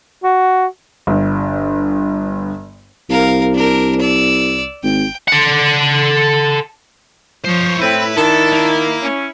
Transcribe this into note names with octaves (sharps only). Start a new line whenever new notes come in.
F#4
G1 G2
C2 A#4 F5
D4 A#4
D5 E6
G#1 G5
A4 F#5
F3 C5 C#5
A2 C4 E4 B4
D#3 D4 A4 A5
A#3
C#4